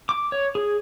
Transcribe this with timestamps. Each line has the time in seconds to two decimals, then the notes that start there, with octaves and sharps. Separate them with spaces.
0.09 D6
0.32 C#5
0.55 G#4